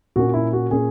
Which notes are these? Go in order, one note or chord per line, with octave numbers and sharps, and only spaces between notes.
A#2 A#3 C#4 F#4
E4
F#4
A#2 A#3 C#4 G#4